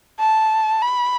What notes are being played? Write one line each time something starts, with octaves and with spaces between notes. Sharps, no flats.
A5
B5